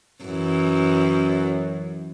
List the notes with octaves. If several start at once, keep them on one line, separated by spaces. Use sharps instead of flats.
F#2 E3